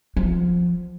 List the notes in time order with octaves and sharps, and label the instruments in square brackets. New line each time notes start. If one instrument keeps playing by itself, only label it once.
[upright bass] F3 B3